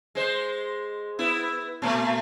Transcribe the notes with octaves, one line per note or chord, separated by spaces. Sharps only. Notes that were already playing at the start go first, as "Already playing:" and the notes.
G#3 C5
B3 E4
A#2 A3